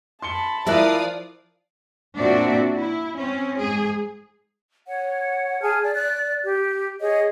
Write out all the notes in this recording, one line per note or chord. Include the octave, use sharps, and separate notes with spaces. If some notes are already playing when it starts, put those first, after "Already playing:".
A5 B5 C6 C#7 G7
F3 E4 A#4 D5 E5 F5 D#6 F#6
A#2 C4 D4 F#4 D5 E5
E4
C4 C#4
G#2 G#4
C#5 F#5
G#4 G#5 A5 F6
D5
D5 F#6
G4
G#4 C#5 D#5